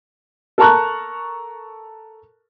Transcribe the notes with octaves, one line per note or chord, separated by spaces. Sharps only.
A4 A#4 A5 A#5 C#6 F#6